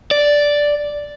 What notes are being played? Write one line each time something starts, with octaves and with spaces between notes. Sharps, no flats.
D5